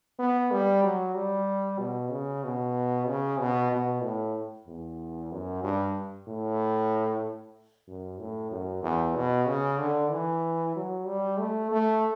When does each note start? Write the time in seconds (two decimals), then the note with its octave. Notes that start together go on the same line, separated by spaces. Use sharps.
0.19 B3
0.51 G3
0.83 F#3
1.15 G3
1.79 B2
2.11 C#3
2.44 B2
3.08 C#3
3.40 B2
3.71 B2
4.03 A2
4.67 E2
5.32 F#2
5.64 G2
6.27 A2
7.88 F#2
8.19 A2
8.52 F#2
8.83 E2
9.16 B2
9.47 C#3
9.79 D3
10.11 E3
10.76 F#3
11.07 G3
11.39 A3
11.71 A3